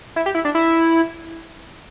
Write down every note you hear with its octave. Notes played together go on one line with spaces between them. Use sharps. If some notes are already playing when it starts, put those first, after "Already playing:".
E4
G4
E4
D4
E4